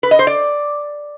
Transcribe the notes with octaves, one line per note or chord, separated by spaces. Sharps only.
B4
D#5
C5
D5